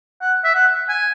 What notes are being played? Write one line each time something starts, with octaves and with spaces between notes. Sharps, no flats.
F#5
E5
F#5
G#5